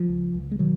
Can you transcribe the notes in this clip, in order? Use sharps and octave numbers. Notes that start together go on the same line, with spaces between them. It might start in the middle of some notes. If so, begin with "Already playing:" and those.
Already playing: F3
C#2
C#2
G#3
B2 D#3 F#3